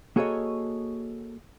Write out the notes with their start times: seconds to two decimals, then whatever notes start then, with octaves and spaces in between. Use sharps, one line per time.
0.16 A#3 F#4 G#4 A4 C#5 D#5